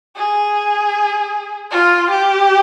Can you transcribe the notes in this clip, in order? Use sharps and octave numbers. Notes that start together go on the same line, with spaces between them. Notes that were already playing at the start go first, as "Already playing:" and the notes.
G#4
F4
G4